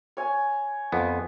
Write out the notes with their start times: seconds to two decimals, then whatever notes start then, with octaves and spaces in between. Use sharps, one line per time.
0.17 C#5 G#5
0.92 F2 B3